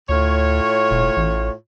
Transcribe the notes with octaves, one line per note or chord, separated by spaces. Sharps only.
D2 A2 F4 C#5
E1
A1